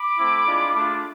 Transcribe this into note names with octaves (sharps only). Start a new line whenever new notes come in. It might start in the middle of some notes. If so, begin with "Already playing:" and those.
Already playing: B5 D6
A3 C4 E4
G#3 D4 F4
A3 D4 F4